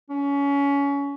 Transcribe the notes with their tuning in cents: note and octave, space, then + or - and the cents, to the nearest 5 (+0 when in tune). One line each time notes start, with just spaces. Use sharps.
C#4 +25